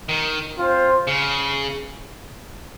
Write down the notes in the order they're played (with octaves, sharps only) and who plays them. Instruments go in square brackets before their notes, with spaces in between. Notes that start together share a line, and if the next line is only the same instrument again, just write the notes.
[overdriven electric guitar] D#3
[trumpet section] C4 F4 C5
[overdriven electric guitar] C#3